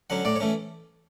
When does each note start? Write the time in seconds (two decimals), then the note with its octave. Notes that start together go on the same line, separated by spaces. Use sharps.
0.10 D3 F#3 C#4 F#5
0.25 A2 D5
0.36 C#5
0.40 E3 A3 C#4